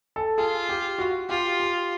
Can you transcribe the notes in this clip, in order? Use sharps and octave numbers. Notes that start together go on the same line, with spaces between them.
A4
F4 G#4
G4
F#4
F4 G4
G4